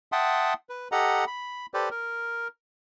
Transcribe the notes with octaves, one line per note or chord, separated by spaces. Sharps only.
E5 F#5 G5 A5 C6 D#6
B4
G4 A4 D#5 F#5 A#5
B5
G4 A4 B4 C5 D5
A#4